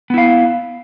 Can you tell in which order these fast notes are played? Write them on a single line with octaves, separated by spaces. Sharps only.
B3 E4 F5